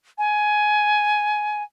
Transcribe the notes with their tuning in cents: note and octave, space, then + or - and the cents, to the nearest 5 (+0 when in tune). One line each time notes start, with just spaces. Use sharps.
G#5 +15